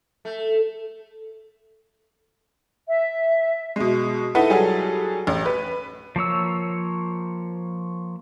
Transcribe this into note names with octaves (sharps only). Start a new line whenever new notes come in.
A3
E5
B2 G#3
D#4 E4 A4 B4 F#5
F#3 G3 F#4 G#4 A4
A1
B4
F3 A#3 C#5 E6